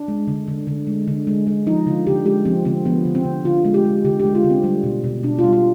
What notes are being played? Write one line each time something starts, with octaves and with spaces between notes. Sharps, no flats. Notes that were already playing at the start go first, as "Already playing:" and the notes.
Already playing: D4
G#3
D3
D3
D3
G#3
D3
G#3
G#3
F3 D#4
D3 F4
D3 G4
G#3 G4
F3 C4
D3 C4
F3 B3
D3
C4
D3
D3 F4
G#3
G4
G#3
D3 G4
G4
G#3
F4
D3
C4
G3
B2
B2
B2 D4
F4
G3
F4